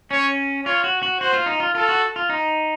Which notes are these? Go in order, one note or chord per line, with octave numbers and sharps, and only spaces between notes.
C#4 C#5
F4 C#5
F#4
F#4
F#4 C5
F4
D#4
F4
F4 A4
F#4
F4
D#4